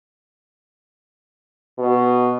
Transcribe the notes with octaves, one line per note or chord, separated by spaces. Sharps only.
B2